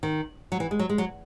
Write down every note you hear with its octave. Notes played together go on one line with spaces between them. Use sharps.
D#3
F#3
E3
G#3
F#3
G#3
F#3